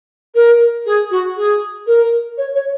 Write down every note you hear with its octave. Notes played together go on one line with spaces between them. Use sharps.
A#4
G#4
F#4
G#4
A#4
C#5
C#5